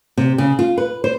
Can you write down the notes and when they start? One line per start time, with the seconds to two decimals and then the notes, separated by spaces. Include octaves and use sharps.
0.17 C3
0.38 C#3
0.59 F4
0.78 B4
1.04 C5